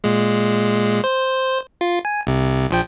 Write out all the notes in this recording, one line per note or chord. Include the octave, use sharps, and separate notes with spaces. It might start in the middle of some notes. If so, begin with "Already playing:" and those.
A#2 G#3
C5
F4
G#5
C2 C3
A#1 F3 G5